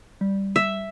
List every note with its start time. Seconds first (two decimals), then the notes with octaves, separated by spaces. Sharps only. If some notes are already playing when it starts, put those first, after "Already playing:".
0.21 G3
0.56 E5